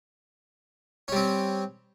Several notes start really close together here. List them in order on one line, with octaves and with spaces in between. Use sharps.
C#4 G3 C4